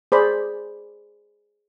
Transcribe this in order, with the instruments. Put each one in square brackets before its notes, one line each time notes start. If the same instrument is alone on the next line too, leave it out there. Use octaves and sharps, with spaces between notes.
[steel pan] G#4 C5 D5 B5